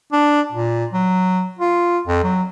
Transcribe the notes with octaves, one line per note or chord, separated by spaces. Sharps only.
D4
A#2
F#3
F4
F2
F#3